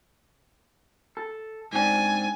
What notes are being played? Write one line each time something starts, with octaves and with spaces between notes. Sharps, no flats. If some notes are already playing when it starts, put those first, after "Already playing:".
A4
G#2 C4 D4 G#5